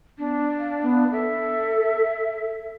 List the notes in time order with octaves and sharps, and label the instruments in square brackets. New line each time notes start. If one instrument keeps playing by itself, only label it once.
[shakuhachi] B3 [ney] D4
[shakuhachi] F5
B3
[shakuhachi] A4 [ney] E5